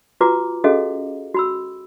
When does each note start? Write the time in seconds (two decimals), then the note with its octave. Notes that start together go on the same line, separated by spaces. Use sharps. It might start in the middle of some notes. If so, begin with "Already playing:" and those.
0.21 F4 F#4 B4 A#5 D6
0.64 C#4 F#4 G#4 A4 D#5 F5
1.35 F#4 B5 E6